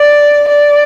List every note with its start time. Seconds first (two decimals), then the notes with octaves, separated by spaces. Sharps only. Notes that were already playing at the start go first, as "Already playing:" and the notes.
Already playing: D5
0.48 D5